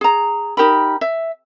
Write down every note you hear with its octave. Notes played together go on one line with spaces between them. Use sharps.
G#4 A#5
D#4 G4 A#4 B5
E5